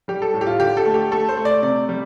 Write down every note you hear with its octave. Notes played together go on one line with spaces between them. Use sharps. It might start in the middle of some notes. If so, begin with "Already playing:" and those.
G3 G4
A4
A2
G4
F4
D3 G4
A4
A3
G4
A3 A4
C5
A3
D5
C3 D5
G3